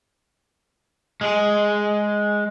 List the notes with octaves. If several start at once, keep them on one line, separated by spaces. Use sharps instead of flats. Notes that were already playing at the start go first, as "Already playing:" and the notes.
G#3 G#4